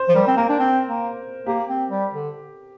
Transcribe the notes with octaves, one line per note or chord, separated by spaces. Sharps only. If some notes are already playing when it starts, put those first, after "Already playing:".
Already playing: C5
F3
G3 A#4
C4
A#3 A#4
D4
C4
A#3
A#3 G4
C4
G3
D3